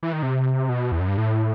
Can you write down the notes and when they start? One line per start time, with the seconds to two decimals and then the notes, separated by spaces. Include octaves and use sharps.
0.03 E3
0.13 D#3
0.23 C3
0.69 B2
0.92 E2
1.00 F#2
1.08 G2
1.18 A2